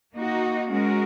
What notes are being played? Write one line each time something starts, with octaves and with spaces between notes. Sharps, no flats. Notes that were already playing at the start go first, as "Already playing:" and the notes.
A#3 D#4 F#4
G#3 C#4 F#4 A#4